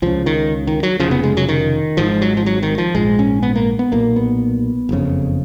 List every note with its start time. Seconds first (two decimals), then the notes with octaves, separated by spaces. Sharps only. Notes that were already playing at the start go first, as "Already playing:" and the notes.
0.02 C#2 C#3 F3
0.26 D#3
0.67 D#3
0.83 F#3
1.00 D#2 C#3 F3
1.03 F1
1.11 B3
1.24 G#3
1.37 F#3
1.49 D#3
1.97 G#1 G#2 F3
2.21 F#3
2.37 F3
2.46 F#3
2.63 D#3
2.78 F3
2.95 A#1 G#2 G#3
3.19 C#4
3.43 B3
3.56 A#3
3.79 B3
3.92 B1 A#2 A#3
4.16 B3
4.89 F#1 F2 C#3